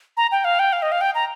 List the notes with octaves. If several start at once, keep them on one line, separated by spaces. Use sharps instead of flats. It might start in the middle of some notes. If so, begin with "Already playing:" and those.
A#5
G5
F5
G5
F5
D#5
F5
G5
A#5